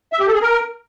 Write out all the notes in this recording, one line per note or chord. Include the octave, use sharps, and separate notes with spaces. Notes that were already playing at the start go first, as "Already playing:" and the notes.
E5
G4
A4
G#4
A#4